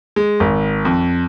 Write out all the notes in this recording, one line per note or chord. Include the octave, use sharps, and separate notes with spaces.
G#3
G#1
F2